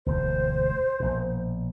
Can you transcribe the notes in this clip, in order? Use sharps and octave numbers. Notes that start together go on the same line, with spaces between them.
E1 D2 C5
A#1 B2